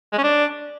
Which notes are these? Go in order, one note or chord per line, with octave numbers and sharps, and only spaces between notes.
G#3
C#4
D4